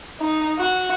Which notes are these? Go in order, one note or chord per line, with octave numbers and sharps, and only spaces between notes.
D#4
F#4